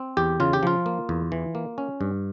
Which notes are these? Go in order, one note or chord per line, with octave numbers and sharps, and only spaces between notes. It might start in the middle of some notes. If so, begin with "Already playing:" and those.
Already playing: C4
E2 G4
C#3 F4
G4
F3 F4
A#3
E2
E3
A#3
C#4
G2